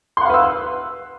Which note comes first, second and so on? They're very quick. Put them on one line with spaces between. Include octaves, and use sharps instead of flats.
C6 F#5 F5 B4 E6